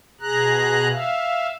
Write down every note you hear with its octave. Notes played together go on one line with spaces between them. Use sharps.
B2 G#4 A#5 F#6
E5 F5